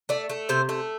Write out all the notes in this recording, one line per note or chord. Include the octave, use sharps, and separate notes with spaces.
A3 D5
A3
C3 C5
A3